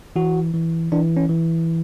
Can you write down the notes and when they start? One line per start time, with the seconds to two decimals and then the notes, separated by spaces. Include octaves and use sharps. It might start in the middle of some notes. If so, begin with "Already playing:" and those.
0.16 E3 F#4
0.54 E3
0.92 E3 D4
1.17 C#4
1.29 E3